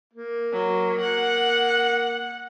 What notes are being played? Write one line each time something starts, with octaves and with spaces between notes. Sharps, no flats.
A#3
F#3
F#5